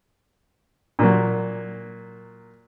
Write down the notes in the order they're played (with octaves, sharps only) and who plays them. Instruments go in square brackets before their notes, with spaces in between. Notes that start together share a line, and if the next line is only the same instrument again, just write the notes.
[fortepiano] A#2 F#3